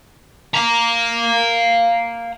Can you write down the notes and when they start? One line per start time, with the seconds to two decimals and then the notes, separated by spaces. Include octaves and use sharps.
0.54 F5 A#5